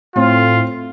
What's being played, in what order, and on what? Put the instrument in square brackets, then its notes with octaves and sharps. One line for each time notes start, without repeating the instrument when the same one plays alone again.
[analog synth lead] A2 [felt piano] C4 [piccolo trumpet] F4